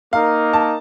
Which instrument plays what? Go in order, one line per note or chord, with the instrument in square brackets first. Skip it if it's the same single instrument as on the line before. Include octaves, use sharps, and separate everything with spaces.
[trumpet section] A#3 D#4 A#4 [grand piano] F5
[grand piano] A5